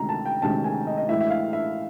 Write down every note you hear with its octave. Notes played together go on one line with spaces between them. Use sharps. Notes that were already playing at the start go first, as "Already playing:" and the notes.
Already playing: D2 C3 D#3 G#3 C#4 A#5
A5
G5
D2 C3 D#3 G#3 C#4 A5
G#5
D#5
D#5
A2 E3 G#3 E5
E5
F5
E5